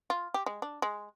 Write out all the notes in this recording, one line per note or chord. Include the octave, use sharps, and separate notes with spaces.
F4
G4
G#3
D4
G#3